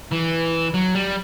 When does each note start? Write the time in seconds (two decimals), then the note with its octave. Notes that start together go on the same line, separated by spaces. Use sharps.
0.12 E3
0.74 F#3
0.95 G3